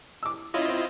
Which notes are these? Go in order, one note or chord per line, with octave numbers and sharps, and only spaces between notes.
D6 E6
C#4 E4 F4 D#5
C4